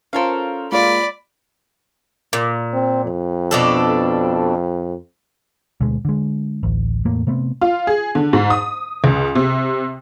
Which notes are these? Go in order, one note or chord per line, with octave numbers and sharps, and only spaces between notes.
C#4 F4 A4 A#4 C5 F5
G#3 A#3 F4 D5 B5
A#2
C4
F2
B2 D4 A4
D2 B2 G#3
D3 G#3
D1 A1
E2 A2 A3 A#3
C3 A3 B3 C4
F4
G#4
D3
G#2
D#6
C#2
C3